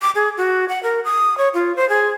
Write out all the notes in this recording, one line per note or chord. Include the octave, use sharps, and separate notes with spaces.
D6
G#4
F#4
F#5
A#4
D#6
C#5
F4
C5
G#4